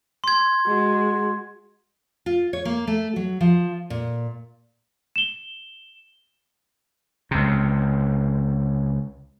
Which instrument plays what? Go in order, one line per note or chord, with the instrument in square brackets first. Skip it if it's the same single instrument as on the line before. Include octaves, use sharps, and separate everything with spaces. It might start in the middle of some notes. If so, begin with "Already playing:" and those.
[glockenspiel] C6 G#6
[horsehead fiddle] G#3 F#4
[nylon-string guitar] F4
C#5
A#3
A3
F#3
F3
A#2
[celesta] E7 G7
[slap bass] C#2 C3